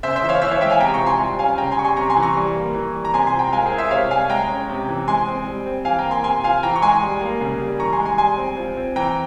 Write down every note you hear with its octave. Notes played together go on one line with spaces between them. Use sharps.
C#3 C5 E5
C5 E5
E3
C#5 F5
E3 C5 E5
C#5 F5
G#3 E5 G5
F5 G#5
C3 G5 A#5
A#5 C#6
F3
G#5 C6
G3
C#4 F5 G#5
C#3 G5 A#5
G#5 C6
G3 C#6
G#5 C6
C3 A#5 C#6
G#5 C6
E3
A#5 C#6
G3
A#3
E3
G3
A#5
C3 G#5 C6
G#5 C6
F3
G5 A#5
G#3 F5 G#5
A#4
G#4 C5
E4
C5 E5
C3 C#5 F5
G3 F5 G#5
G#3 G5 A#5
C#4
C3
E3
G#3 G#5 C6
C4
G3
C4
E3 F5 G#5
G5 A#5
A#3
G#5 C6
C3 G#5 C6
F3 F5 G#5
E3 G5 A#5
C#6
G#3 G#5 C6
G3
A#3
C#3
G3
E3 A#5 C#6
G#5 C6
G#3
G#5 C6
G3 G#5 C6
C4
F3
C4
E3 G5 A#5